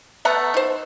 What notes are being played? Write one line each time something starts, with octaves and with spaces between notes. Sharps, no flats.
A3 B3 F#5 A#5
D#4 C5